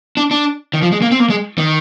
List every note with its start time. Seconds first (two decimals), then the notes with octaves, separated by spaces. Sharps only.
0.17 D4
0.31 D4
0.74 D#3
0.82 F3
0.92 G#3
1.02 A#3
1.11 C4
1.20 A#3
1.30 G#3
1.58 D#3